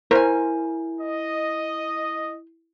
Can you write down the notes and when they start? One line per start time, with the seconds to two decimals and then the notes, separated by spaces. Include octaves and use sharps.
0.11 E4 A#4 C5 G#5
1.00 D#5